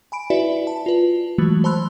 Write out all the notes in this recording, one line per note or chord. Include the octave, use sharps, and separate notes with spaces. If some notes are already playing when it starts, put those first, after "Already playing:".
G#5 B5 D7
E4 F#4 B4 D5 E5
A5
F4 B4
E3 F#3 G#3 A3 F#4
C5 A5 B5 C6 E6 F#6